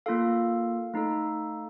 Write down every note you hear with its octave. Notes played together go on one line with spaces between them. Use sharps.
A#3 F4 A4 F5
A3 D#4 A4